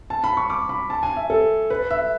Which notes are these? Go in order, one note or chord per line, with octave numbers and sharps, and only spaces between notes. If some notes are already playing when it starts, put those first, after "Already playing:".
A5
B5
C#6
D6
B5
A5
G#5
E5
A4
B4
E5